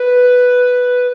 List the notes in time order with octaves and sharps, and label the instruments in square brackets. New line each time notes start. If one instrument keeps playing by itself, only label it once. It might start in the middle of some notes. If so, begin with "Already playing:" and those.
Already playing: [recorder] B4